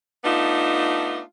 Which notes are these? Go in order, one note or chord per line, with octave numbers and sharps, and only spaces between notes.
A3 B3 D4 D#4 F4